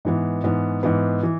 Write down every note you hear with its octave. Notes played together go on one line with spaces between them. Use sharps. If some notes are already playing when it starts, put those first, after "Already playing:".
G#2 E3 B3
G#2 E3 B3
G#2 E3 B3
E3